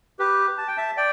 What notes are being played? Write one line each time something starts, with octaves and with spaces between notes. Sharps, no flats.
G4 B4
A5
G5
E5 A5
D5 G5